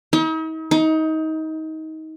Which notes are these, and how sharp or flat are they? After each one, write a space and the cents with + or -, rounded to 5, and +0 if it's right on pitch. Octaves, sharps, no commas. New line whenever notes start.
D#4 +45
D#4 +25